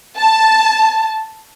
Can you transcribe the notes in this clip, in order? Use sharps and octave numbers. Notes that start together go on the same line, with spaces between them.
A5